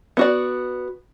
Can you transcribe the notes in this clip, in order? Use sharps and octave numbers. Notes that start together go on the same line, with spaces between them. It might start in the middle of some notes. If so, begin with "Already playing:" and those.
B3 F#4 D5